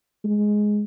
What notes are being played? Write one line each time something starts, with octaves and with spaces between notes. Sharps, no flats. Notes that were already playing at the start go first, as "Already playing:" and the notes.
G#3